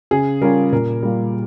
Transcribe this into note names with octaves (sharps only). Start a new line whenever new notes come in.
C#3 G#4
G3 C#4 F4 A#4
A#2 A#4
G3 A#3 F4